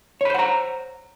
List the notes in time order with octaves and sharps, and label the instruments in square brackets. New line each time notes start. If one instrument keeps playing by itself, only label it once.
[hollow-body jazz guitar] C#5
B5
C5
F#5
A#5